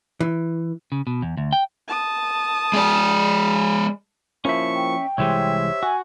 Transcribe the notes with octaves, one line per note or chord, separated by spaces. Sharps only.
E3
C#3
B2
E2
D2
G5
A5 D#6
G#3 D5
F3 A#3 C#4 E4 E5 C#6
G5
C2 E3 G#3 G4 C5 C#5 E5
F#4 G#5